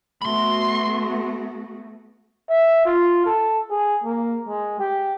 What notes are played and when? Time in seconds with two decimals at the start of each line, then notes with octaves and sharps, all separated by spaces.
0.22 A3 B3 F#4 B5 C6
2.50 E5
2.85 F4
3.26 A4
3.70 G#4
4.04 A#3
4.48 G#3
4.80 G4